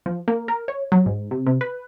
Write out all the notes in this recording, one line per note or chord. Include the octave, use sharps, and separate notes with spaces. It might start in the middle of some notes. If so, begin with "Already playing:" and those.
F3
A#3
A#4
C#5
F#3
G#2
C3
C3
B4